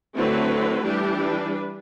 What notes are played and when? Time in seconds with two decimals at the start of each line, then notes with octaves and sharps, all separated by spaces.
0.15 D3 F#3 A3 C4 E4 B4
0.84 E3 G3 D4 G4
1.19 B4